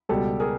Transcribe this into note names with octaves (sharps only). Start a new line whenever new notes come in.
C#2 B2 G3 G4 A4
G#4 A#4